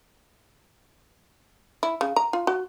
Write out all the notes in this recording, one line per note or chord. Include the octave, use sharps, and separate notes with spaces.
E4
C#3
A#5
F4
F#4